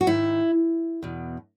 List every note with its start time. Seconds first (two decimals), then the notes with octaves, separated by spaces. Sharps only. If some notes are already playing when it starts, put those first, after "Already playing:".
0.01 F#4
0.07 G#2 D#3 E4
1.03 E2 B2